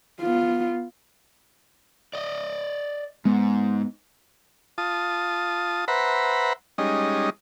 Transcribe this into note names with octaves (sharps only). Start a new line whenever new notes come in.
B3 F4
D5 D#5
G#2 G#3 B3
F4 A5 D#6
B4 C5 E5 F#5 A#5 B5
G3 G#3 C#4 D#4 D#5